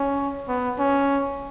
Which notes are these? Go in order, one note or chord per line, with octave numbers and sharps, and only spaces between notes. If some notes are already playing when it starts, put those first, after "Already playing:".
Already playing: C#4
B3
C#4